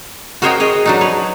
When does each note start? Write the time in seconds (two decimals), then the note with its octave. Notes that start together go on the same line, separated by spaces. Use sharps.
0.42 F#4 A#4 C5 C#5 D#5 G5
0.60 G#4 C#5 D#5
0.86 F#3 D4 D#4
1.01 B4 C#5